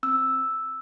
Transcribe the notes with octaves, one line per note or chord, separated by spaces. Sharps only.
C4 E6